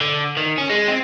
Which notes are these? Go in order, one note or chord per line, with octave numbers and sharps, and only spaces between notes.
D3
D#3
C#4
G#3
C4